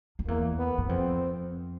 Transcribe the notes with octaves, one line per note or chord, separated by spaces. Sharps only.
F2
E2 A#3
B3
F#2
F2 C4